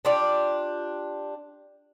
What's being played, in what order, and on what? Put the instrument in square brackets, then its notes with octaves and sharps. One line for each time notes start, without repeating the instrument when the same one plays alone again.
[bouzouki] D4 F4 G4 D5